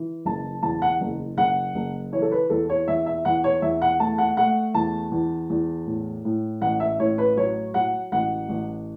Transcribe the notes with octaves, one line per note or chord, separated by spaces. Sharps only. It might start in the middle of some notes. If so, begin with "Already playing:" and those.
Already playing: E3
F#1 A5
E2 A5
F#5
F#1
F#1 F#5
F#1
E3 C#5
A4
B4
E2 A4
C#5
E2 E5
E5
E2 F#5
C#5
E2 E5
F#5
A3 A5
F#5
A3 F#5
E2 A5
E2
E2
A2
A2
A1 F#5
E5
A2 C#5
B4
F#3 C#5
F#3 F#5
A1 F#5
A1